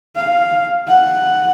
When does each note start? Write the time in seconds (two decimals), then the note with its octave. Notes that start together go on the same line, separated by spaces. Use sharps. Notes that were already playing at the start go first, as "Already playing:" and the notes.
0.16 F5
0.87 F#5